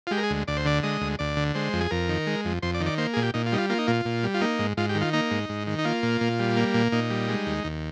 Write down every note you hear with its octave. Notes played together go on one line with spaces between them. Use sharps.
F4
G#3 G4
A#4
G#4
D2
D2 D5
C5
D3 D5
G#3 D#5
D2
D2 D5
D3
G#3 C5
F2
G#4
F2 A#4
D#3
G#3
F2
F2 C5
D5
D#3
D5
A#3 C5
A#2 G#4
G4
A#2 D#4
F4
G3 D#4
F4
A#3 F4
D#4
A#2 F4
A#2
G3
F4
A#3 D#4
G#2
G#2 F4
G4
D#3
F4
A#3 D#4
G#2
G#2
D#3
D#4
A#3 F4
A#2
A#2
G3
A#3
A#2
A#2 D#4
G3
G#3
D#2
D#2